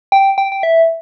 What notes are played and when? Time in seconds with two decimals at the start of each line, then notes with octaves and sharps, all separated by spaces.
0.12 G5
0.38 G5
0.52 G5
0.63 E5